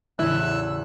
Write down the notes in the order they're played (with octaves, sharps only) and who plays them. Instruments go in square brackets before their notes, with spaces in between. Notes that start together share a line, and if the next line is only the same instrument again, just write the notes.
[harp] A1 E2 [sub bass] C#3 [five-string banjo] E4 [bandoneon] E6 F#6